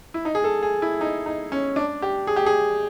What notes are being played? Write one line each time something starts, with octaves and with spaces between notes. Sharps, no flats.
E4
D#4
G#4
A4
G#4
E4
D#4
D#4
C#4
D4
G4
G#4
G4
G#4